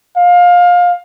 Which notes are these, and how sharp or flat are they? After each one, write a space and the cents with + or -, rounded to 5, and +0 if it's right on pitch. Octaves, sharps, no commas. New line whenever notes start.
F5 +20